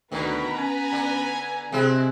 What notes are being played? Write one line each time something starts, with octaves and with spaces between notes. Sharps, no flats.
D2 B2 D#3 B3 B4 A#5
C#4 G#5
D3
C3 G#3 C4 E4